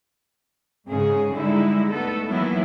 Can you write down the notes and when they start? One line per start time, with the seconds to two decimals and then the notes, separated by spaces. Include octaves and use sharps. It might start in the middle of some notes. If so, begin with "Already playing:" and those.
0.90 G#2 C#3 G#4
1.35 D3 G3 G#3 D#4 E4
1.91 A3 B3 A4
2.28 D#3 E3 F#3 A#3 B3 E4